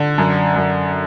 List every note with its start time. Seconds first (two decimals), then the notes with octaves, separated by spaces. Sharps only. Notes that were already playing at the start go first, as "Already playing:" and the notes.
Already playing: D3
0.18 F#2
0.56 F#2